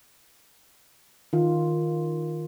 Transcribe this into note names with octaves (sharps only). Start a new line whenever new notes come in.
D#3 F4